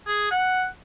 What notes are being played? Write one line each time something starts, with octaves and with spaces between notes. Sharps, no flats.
G#4
F#5